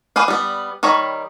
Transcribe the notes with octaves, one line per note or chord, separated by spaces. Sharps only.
A#3 G4 G#4 B4 F5
G3 B3
D#3 G3 C#5 A#5 B5